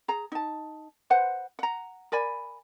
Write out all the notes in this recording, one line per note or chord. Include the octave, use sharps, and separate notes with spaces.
G#4 A#5
D#4 A5
B4 C5 F#5
F#5 A#5
A#4 D5 G#5 B5